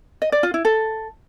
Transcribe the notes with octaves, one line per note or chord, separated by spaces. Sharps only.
D#5
D5
F4
E4
A4